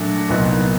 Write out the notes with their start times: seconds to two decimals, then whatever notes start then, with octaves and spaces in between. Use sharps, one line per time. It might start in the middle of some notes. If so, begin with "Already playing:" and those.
Already playing: A#2 F#3 A3 D4
0.29 C2 A#2 F#3 B3 D#4